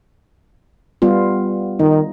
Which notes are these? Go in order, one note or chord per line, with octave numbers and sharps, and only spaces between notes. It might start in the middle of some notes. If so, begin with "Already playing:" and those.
G3 B3 F4
D#3 D#4